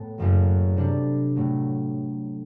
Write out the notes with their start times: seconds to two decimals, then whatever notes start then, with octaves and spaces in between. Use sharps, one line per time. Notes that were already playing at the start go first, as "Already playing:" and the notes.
Already playing: A2 B3 A4
0.18 F#1 F#2 F#3
0.77 C3 G3 D4 A4
1.36 A2 F#3 A3